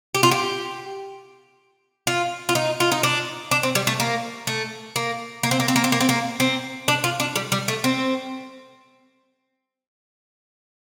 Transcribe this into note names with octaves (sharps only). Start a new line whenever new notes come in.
G4
F4
G4
F4
F4
D#4
F4
D#4
D4
D4
C4
G3
A3
A#3
A3
A#3
A#3
C4
A#3
C4
A#3
C4
A#3
C4
A#3
C4
D4
F4
D4
G3
G3
A3
C4